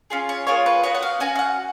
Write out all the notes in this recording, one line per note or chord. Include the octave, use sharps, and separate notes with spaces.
C#4 F4 G#4
C#5
A#3 F4 G#4 C#5
B4
B3 F#4 C#5
F#5
F5
C#4 F#4 G#5
F5
F#5